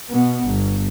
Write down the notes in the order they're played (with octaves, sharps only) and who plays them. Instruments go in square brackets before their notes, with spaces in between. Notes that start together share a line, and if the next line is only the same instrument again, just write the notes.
[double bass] B2 B3
G1